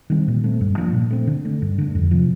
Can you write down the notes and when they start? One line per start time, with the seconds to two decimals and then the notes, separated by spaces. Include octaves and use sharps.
0.10 D#3 G3 C4
0.28 A#2
0.44 A3 C4
0.61 G2
0.78 F3 A#3 D4
0.94 A#2
1.11 A3 C4
1.27 D3
1.45 A3 D4
1.62 G2
1.78 D3 A3
1.95 F2
2.11 C3 F3